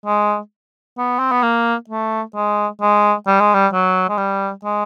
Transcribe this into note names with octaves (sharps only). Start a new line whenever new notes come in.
G#3
B3
C4
B3
A#3
A3
G#3
G#3
G3
G#3
G3
F#3
G#3
G3
G#3